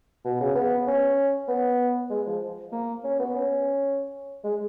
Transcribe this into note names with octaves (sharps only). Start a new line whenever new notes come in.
B2
C#3
B3
C#4
B3
G#3
F3
A#3
C#4
B3
C#4
G#3